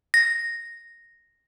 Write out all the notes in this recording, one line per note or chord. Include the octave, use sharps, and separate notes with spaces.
A#6